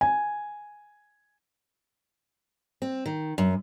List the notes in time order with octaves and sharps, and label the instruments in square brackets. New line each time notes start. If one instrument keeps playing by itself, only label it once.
[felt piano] G#5
[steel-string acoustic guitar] C4
D#3
F#2